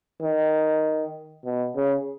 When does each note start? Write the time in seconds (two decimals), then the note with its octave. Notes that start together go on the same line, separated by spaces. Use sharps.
0.22 D#3
1.45 B2
1.76 C#3